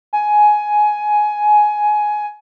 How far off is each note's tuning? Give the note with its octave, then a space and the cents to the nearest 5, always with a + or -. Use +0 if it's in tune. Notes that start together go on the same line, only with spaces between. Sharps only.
G#5 +15